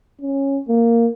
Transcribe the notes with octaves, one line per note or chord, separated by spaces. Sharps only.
C#4
A#3